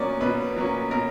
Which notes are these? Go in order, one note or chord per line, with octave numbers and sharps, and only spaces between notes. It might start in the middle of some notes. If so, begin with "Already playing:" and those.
Already playing: B2 F#3 A#3 C#4 D5
B2 B4
F#3 A#3 C#4
B2 A#4